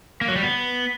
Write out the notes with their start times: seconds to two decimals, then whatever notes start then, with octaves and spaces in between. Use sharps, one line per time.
0.21 A#3
0.28 F#3
0.36 G3
0.43 B3